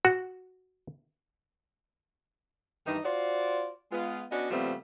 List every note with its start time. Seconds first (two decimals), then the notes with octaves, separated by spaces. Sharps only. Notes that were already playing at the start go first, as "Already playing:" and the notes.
0.05 F#4
2.87 G2 D#3 E3 D#4
3.05 F4 F#4 C5 D5
3.92 G#3 B3 F4
4.32 B3 C#4 D4 F#4 D5 D#5
4.51 C#3 F3 G3 A3 B3 C4